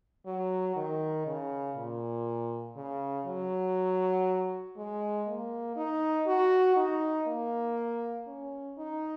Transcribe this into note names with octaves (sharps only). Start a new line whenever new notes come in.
F#3
D#3
C#3
A#2
C#3
F#3
G#3
A#3
D#4
F#4
D#4
A#3
C#4
D#4